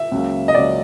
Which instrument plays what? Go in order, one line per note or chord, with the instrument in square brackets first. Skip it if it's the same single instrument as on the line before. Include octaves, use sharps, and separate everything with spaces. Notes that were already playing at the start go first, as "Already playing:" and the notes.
Already playing: [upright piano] E5
[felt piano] C#2 C#3 F#3 A#3
[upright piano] D#5
[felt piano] C#2 C#3 F#3 A#3 [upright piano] D5